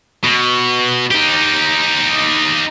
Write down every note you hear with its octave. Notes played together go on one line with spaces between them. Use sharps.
B2
D#4 G4